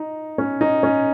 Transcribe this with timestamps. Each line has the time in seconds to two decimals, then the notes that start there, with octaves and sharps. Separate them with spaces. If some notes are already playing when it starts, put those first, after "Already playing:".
Already playing: D#4
0.38 C#4
0.61 D#4
0.83 C#4